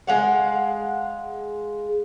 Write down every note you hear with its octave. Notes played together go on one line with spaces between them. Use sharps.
G#3 F5 F#5